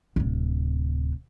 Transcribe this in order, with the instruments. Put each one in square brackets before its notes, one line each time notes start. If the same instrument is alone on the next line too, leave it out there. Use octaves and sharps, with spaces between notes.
[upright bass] D1 C3